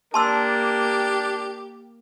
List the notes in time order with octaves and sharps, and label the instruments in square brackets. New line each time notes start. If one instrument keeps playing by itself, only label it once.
[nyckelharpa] A#3 [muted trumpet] D4 [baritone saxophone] G4 [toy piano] A5 C6 E6